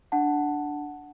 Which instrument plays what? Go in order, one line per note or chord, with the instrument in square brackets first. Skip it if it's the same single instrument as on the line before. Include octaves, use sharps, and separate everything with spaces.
[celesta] D4 F#5 A5